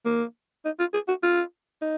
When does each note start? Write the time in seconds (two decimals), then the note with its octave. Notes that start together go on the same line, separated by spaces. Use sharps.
0.05 A#3
0.65 D#4
0.79 F4
0.94 G#4
1.08 F#4
1.23 F4
1.82 D#4